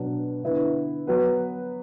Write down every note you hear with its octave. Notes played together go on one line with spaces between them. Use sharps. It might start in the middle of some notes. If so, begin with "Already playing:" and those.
Already playing: B2 F#3 D4 B4
D3 B3 E4 B4
F#3 B3 F#4 B4